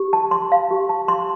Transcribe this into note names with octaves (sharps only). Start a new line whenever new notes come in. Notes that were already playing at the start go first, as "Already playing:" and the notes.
Already playing: G4
A5
C6
F5
G4
A5
C6